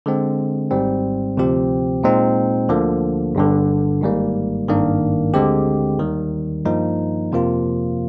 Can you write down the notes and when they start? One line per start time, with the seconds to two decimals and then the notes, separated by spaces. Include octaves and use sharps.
0.06 D3 G#3 C4
0.71 G#1 G#2 G3 C4
1.37 D2 C3 F3 C4 G4
2.03 A#2 G#3 C4 D#4
2.69 D2 D3 F3 A#3
3.35 G1 G2 D3
4.01 G#1 G#2 G3 A#3
4.68 G#1 G2 D#3 A#3 D4
5.34 D2 D3 G#3 C4 G4
5.99 D#2 D#3 G3
6.65 G2 F3 A#3 D#4
7.32 F2 C3 F3 A#3 F4